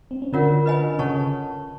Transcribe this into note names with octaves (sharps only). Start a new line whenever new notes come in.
C4
C#4
D3 D4 F4 A#4 C#5 F#5
B4 D#5 G#5 B5
C#3 C#4 A4 C#5 F#5 A5 C#6